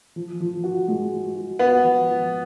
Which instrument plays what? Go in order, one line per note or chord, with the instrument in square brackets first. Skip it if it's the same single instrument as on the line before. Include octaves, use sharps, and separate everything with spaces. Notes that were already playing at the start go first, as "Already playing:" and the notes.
[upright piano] F3
F3
F#4
G#3
F#4
F#4
[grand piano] B3 [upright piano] F#4
[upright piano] F3
F3